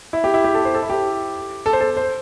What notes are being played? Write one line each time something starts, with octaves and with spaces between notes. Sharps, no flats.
E4
G4
E4
G4
A4
C5
A4
E4
G4
A4
C5
A4
C5